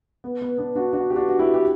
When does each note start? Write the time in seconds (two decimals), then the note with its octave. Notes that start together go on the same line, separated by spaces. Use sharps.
0.24 B3
0.41 B3
0.58 B3 D4
0.75 D4 F#4
0.93 D4 F#4
1.10 G4
1.16 D4 F#4
1.29 F#4
1.39 E4 G4
1.54 G4